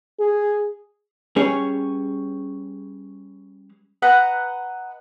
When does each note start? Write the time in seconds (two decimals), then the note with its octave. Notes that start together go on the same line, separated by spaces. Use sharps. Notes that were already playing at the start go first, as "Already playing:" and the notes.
0.20 G#4
1.36 G3 C#4 G#4 B4 C#5
4.02 B4 D#5 F#5 A#5